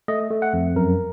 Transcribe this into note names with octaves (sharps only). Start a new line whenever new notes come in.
A3 D#5
A3
F#5
F2
F#2 A#4